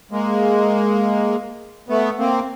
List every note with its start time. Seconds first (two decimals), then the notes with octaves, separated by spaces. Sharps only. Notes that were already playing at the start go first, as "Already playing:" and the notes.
0.11 G#3 A#3
1.89 A3 B3
2.19 A#3 C4